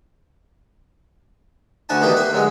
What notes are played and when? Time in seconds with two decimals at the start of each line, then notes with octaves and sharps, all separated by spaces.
1.89 D2 D3 F#4 G#5 A5
2.01 B2 D#3 E3 D4 D#4 G4
2.16 G3 A#3 B4 E5
2.32 D3 F#3 G#3